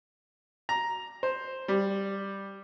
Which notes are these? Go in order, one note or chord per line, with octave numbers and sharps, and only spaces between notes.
A#5
C5
G3